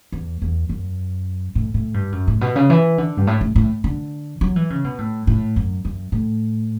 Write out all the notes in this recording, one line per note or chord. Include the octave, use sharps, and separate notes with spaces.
E2
E2
F#2
A2
A2
G2
F#2
A2
B2
C#3
E3
D3
G2
A2
A2
A2
D3
F#3
E3
C#3
B2
A2
A2
F#2
F#2
A2